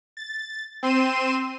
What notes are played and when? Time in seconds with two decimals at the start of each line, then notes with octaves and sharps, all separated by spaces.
0.17 A6
0.83 C4 C6 D#7 E7